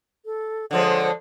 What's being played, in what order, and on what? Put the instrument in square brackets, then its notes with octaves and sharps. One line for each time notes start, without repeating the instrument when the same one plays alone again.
[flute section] A4
[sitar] D3 F3 G#3 [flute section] C5 C#5 F#5